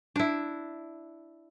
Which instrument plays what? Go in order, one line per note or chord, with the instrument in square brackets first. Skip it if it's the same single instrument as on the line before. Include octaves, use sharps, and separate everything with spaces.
[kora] D4 E4